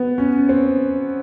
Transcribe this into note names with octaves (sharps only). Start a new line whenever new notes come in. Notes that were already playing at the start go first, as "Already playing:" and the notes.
Already playing: B3
C#4
C4